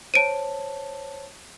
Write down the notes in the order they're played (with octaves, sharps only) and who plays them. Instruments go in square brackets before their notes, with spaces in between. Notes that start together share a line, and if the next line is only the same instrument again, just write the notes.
[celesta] C5 C#5 A5 [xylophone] D7 D#7